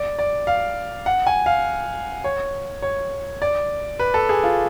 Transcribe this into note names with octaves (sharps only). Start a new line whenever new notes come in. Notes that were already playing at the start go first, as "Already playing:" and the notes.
Already playing: D5
D5
F5
F#5
G#5
F5
C#5
C#5
D5
B4
A4
G#4
F4